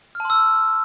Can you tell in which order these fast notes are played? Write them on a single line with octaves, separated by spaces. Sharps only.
F6 A5 C6 E6